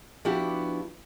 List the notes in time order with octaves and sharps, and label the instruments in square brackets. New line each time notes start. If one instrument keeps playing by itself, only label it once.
[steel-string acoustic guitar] F3 B3 D4 E4 F#4 G4